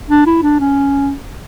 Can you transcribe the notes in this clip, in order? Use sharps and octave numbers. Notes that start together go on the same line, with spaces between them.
D4
E4
D4
C#4